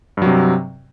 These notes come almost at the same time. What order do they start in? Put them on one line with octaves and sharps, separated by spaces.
G2 F#3 C3